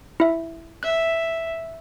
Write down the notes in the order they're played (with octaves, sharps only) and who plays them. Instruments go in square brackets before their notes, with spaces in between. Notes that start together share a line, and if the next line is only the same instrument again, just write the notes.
[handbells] E4 E5
[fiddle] E5 [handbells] F#6